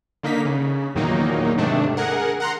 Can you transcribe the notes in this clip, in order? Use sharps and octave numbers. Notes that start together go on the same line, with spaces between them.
D3 A#3 D#4 B6
C#3
E2 A#2 D#3 F#3 A#3 D#4
G#2 C3 D#3 A3 D4
G#4 A#4 F#5
F#5 A#5 C6